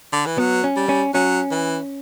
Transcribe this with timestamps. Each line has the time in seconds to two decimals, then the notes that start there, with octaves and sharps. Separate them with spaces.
0.13 D3
0.26 E3
0.38 F#3 B3
0.64 C#4
0.76 G3
0.89 C#4
1.14 F#3 C#4
1.51 E3